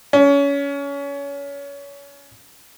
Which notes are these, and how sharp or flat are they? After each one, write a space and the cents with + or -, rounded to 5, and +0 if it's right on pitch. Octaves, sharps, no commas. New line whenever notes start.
C#4 +25